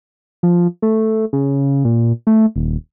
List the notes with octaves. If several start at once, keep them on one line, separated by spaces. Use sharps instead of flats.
F3
A3
C#3
A#2
A3
D#1